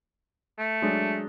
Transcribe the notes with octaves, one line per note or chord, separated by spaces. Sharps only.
A3
F#3 G#3 D4